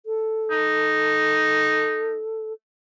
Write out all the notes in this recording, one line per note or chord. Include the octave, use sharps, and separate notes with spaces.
A4
D#4